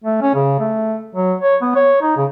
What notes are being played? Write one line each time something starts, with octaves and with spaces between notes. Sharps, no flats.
A3
C#4
C#3
A3
F#3
C#5
B3
C#5
D#4
C#3